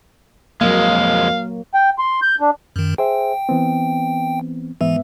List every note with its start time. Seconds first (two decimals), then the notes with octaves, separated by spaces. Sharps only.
0.61 F2 F#3 G#3 A#3 F5
1.74 G5
1.99 C6
2.22 G6
2.41 D4
2.76 F#2 D#3
2.98 G#4 C5 E5 G5
3.49 E3 B3 C4
4.81 G#2 E3 B3 E5